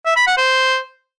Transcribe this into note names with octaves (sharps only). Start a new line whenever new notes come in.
E5
B5
F#5
C5